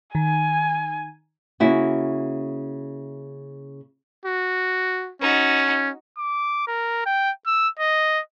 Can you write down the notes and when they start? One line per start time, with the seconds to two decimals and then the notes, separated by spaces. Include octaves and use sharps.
0.15 D#3 G#5
1.60 C#3 A#3 E4 F#4
4.25 F#4
5.21 C#4 D#4 F#4
6.18 D6
6.67 A#4
7.06 G5
7.46 E6
7.79 D#5